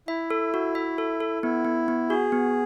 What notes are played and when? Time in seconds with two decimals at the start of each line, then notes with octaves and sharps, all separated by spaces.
0.08 E4 E5
0.30 A4
0.54 F#4
0.75 E5
0.98 A4
1.20 A4
1.43 B3 E4
1.65 B3
1.88 B3
2.10 F#4 G#4
2.32 B3